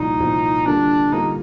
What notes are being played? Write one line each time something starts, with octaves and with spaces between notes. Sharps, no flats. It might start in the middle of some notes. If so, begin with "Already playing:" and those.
Already playing: C2 A#2 F3 D#4
C2 A#2 F3
D3 G3 A#3 D4 F4 A#4
D3 G3 A#3 D#4 F4 A#4